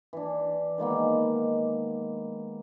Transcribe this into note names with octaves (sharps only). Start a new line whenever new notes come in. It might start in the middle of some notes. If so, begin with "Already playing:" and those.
E3 D4
D#3 G#3 A#3 B3